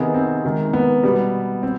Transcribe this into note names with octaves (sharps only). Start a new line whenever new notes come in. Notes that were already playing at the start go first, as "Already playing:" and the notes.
Already playing: C3 D#3 B3 D#4 G#4
C4
C3 D#3 G#3
B3
B2 G3 B3
C4